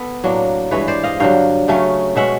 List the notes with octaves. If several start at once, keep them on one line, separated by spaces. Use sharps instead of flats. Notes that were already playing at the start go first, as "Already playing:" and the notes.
Already playing: B3 A4 B4
A2 F#3 A#3 D4
G2 E3 G#3 B4 C#5
C5 D5
D#5 F5
G2 D3 F#3 F5 G5
C#3 F#3 A3 C#4
B2 G#3 C#4 E5 F#5